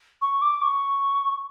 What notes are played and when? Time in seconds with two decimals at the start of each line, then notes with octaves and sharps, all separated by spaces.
0.21 C#6
0.42 D6
0.62 C#6